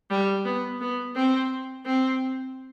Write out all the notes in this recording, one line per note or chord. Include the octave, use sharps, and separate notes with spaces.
G3
B3
B3
C4
C4